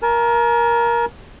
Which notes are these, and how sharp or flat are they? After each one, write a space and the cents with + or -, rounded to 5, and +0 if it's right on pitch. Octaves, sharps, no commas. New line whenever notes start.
A#4 +15 A5 -45